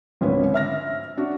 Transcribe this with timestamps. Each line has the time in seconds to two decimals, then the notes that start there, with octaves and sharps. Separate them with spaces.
0.21 G#1 C#2 D3 B4 C#5
0.54 E5 F6 A#6
1.17 D4 F#4